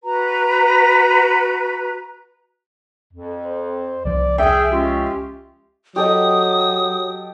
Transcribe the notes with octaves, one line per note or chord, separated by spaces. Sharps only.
F#4 B4 A#5
F2
C5
C2 F3 D5
G#4 E5 G5
G#3 C#4 F4 G4
F#3 G4 A4 D#5 D#6